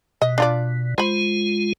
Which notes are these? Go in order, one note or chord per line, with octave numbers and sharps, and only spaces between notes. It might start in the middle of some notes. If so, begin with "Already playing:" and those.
B2 D#5
D4 F4 D5
G#3 F4 C5 B5